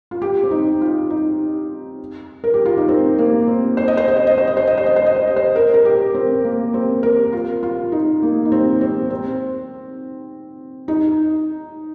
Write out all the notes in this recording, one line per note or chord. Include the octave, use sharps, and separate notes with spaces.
F4
G4
C4
D#4
F4
D#4
A#4
G4
F4
D#4
C4
A#3
C4
C5
D#5
C5
D#5
C5
D#5
C5
D#5
C5
D#5
C5
D#5
C5
D#5
C5
D#5
C5
A#4
A#4
G4
C4
A#3
C4
A#4
F4
F4
D#4
A#3
D#4
C4
C4
C4
D#4